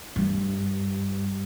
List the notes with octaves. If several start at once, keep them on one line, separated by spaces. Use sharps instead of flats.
G2